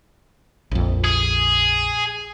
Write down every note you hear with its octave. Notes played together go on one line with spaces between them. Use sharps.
A#1 F2
G#4